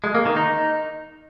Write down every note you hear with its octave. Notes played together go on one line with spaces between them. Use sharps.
G#3
A#3
D#3
D#4